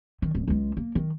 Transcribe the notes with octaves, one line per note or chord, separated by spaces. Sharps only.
D#3
D1
C#2 G#3
A#3
D#3